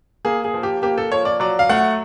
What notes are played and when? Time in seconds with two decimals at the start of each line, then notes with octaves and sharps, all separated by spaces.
0.25 A#3 G#4
0.45 G#4
0.54 F3
0.63 G4
0.82 A#3 G4
0.98 A4
1.12 F3 C#5
1.25 D5
1.40 F#3 D5
1.59 F5
1.69 A3 F#5